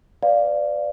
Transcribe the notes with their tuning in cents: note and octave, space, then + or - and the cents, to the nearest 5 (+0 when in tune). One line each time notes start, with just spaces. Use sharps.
B4 +45 D5 +0 F5 +0